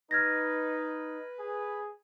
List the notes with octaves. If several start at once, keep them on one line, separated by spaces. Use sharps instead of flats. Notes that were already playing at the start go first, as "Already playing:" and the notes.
D#4 B4 F6 G#6 A#6
G#4